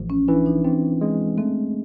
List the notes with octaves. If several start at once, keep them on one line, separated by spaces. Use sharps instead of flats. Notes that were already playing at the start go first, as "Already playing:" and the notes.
Already playing: A1 F3
C#4
E3 D4
D#4
C4 D4
G#3
A3 C4